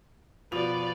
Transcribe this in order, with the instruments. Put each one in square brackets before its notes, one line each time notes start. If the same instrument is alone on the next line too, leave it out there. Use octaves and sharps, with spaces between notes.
[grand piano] B2 F3 F7 [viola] B4 D5